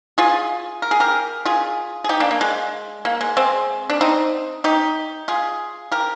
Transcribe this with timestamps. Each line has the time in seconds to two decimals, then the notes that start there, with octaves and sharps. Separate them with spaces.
0.18 F4 G#4
0.82 A#4
0.91 G#4
1.00 G4 A#4
1.45 F4 G#4
2.04 G#4
2.09 D#4 G4
2.20 A#3 D4
2.31 A#3
2.41 G#3
3.05 A#3
3.21 G#3
3.37 G#3 C4
3.90 D4
4.01 C4 D#4
4.64 D#4 G4
5.28 F4 G#4
5.92 G4 A#4